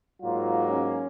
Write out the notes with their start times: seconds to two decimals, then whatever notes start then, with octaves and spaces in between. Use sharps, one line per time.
0.21 G#2 F#3 A#3 F4
0.70 C#4